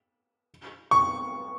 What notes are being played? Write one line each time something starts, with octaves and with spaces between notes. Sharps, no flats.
C#6